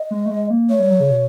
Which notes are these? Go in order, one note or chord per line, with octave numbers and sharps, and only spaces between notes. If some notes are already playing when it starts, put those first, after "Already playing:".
Already playing: D#5
G#3
A3
G#3
A#3
A3 C#5
G3
F#3
C#3
B2